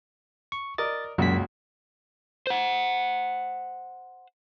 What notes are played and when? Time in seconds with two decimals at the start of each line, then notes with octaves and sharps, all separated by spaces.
0.52 C#6
0.78 A#4 D5 D#5 A6
1.18 C#2 F#2 A#2 F#4 B6
2.47 C5 F#5